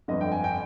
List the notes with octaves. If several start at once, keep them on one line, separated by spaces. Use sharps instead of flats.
G1 F2 D3 D#5
G5
G#5
G5